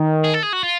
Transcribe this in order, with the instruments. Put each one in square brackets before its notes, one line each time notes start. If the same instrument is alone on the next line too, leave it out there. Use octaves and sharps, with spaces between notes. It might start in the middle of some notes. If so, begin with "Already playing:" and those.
Already playing: [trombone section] D#3
[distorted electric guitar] G#4
A4
G#4
F#4
F4